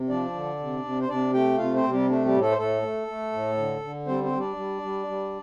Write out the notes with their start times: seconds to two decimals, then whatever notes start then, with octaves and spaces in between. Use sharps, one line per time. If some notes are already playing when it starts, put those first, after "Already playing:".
Already playing: C3
0.09 F3 D4 D5
0.35 D3
0.59 C3
0.84 C3
1.01 C5
1.09 C3 D4 D5
1.33 A3 G4 G5
1.58 C3 F4 F5
1.75 C4 C5
1.83 C3
1.91 G3 G4
2.08 A3 D4
2.25 G3 G4
2.33 A2
2.41 A3 A4
2.51 C5
2.57 A2 A3 A4
2.83 A3
3.07 A3
3.32 A2
3.57 D3
3.81 D3
4.07 G3 C4 C5
4.23 C4 C5
4.32 G3
4.40 D4 D5
4.56 G3
4.82 G3
5.07 G3